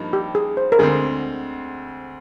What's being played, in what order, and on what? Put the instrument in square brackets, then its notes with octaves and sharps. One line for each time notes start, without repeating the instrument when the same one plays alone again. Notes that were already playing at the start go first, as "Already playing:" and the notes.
Already playing: [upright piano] G2 F3 A#3 D#4
[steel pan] G4
G#4
C5
A#4
[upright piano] D2 D3 G#3 C4 [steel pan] G#4